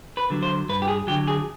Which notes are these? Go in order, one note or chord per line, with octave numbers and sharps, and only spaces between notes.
B4
D3 F#3
C5
G2 B4
G4
G#4
D3 F#3 G4
G#4